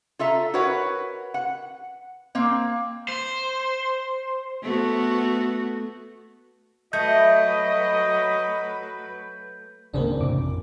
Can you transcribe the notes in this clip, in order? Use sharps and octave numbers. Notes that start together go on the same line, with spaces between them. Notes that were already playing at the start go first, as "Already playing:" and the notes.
F4 A4 E5 A#5
F#4 A#4 B4 C#5 F#5
F#5
A#3 C4
C5
A3 B3 F#4
F#3 A3 B4 D#5 G6
D1 G#1 C#3 A#3 C4 D4
A1 F2 A2 C3 D6